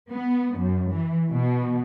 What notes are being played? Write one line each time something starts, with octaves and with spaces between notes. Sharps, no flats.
B3
F#2
E3
B2